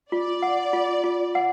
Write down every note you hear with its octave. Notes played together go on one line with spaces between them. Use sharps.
F4 D5
F#5
F4
F4
F#5